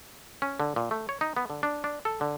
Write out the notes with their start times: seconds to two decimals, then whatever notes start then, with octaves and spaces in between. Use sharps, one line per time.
0.42 C#4
0.60 D3
0.76 A#2
0.91 A3
1.09 C#5
1.21 D#4
1.37 B3
1.50 D3
1.63 D4
1.84 D4
2.05 A4
2.21 D3